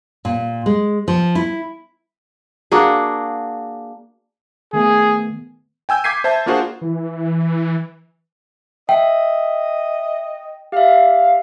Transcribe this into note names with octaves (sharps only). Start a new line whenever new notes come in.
A#2
G#3
F3
E4
A#3 D4 F#4 G#4
D#3 A3 B3 G#4
G5 G#5 E6 G6
D6 G6 G#6 B6 C7 D#7
C5 E5 A5 G6
A#3 D4 F4 F#4 G#4 C5
E3
D#5 E5 G5
G4 E5 F5